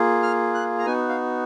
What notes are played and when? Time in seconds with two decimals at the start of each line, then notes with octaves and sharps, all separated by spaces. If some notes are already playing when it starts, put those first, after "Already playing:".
Already playing: A#3 F4 G#4
0.23 F6
0.54 F#6
0.79 A#5
0.86 B3 D#4 F#4 G#5
1.09 F5